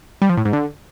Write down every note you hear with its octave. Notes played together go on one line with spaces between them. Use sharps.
G3
F3
A2
G#2
D3